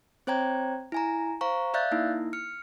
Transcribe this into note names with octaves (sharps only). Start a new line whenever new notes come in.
C4 C5 C#5 G5 A#5 G#6
E4 G#5 A#5
C5 F5 A#5 C#6
D5 E5 F5 F#6 G6 A6
A#3 D#4 E4
F6 C#7